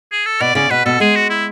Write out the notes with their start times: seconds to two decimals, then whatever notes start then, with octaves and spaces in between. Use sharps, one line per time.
0.12 G#4
0.26 A4
0.41 B2 D5
0.55 C#3 D5
0.71 B2 B4
0.85 B2 A4
1.00 G#3 G#4
1.16 F#4
1.30 E4